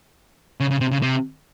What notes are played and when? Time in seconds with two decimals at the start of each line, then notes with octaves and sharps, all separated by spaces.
0.60 C#3
0.71 C#3
0.81 C3
0.92 C#3
1.02 C3